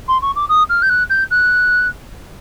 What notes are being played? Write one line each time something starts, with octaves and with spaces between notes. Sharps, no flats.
C6
C#6
D6
D#6
F6
G6
F#6
G6
F#6